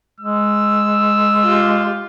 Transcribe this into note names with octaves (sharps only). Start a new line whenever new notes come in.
G#3 E6
F4 G4